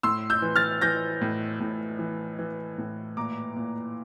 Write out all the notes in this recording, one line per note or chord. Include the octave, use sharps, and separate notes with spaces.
A2 C6 E6
E6 G6
E3
F6 A6
E3 G6 A#6
A2
A2
E3
E3
A2
A#2 A#5 D6
A#2